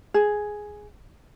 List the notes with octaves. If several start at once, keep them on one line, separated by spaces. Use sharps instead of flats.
G#4